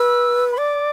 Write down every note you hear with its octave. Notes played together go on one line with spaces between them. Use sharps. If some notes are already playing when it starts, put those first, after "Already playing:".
Already playing: B4 E6
B5
D5 D6